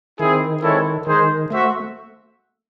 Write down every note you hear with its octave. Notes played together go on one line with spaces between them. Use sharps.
D#3 C4 E4 G#4
G#3 C4 E4 A4 C#5
D#3 G#3 D#4 G#4 C5
A3 F#4 C5 E5